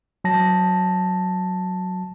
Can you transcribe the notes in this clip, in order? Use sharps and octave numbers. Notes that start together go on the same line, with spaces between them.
F#3 A5 A#6